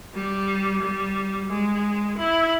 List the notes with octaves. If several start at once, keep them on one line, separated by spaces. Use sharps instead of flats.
G3
G3
G#3
E4